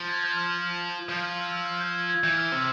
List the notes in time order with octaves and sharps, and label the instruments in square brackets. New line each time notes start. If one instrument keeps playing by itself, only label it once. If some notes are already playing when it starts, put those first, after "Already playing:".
Already playing: [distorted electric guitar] F3
[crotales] G#6
G6
F6
[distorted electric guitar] F3 [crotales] G6
[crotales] F6
E6
E6
F6
G#6
G6
G#6
G#6
[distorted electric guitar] E3 [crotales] G6
[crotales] F6
[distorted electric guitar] C3 [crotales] E6